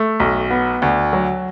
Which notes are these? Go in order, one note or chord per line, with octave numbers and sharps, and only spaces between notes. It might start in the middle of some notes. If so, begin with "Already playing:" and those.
Already playing: A3
B1
B3
D2
F#3